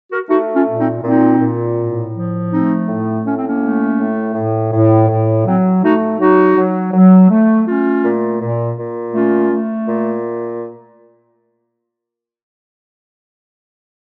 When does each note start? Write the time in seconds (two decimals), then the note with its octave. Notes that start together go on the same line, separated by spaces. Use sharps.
0.11 F#4 A#4
0.29 A3 D#4 F#4
0.54 C#4 F4
0.66 A#2
0.78 C4 D#4
1.03 A#2 C4 D#4
1.40 A#2
1.77 A2
2.13 F3
2.51 A3 C4 D#4
2.88 A2
3.24 A2 C#4
3.35 C4
3.46 A#3 C#4
3.60 A3
3.98 A2
4.34 A2
4.71 A2
5.08 A2
5.45 F#3 C4
5.82 A3 D#4 F#4
6.19 F#3 D#4 F#4
6.56 F#3
6.92 F#3
7.29 A3
7.66 A3 C#4 F4
8.03 A#2
8.39 A#2
8.76 A#2
9.13 A3 C#4 F4
9.50 A3
9.87 A#2